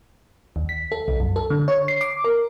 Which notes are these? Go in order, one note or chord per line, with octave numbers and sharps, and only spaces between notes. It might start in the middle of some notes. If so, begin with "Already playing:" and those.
D#2
B6
A4
C2
F#2
A4
D3
C#5
C7
D6
A#4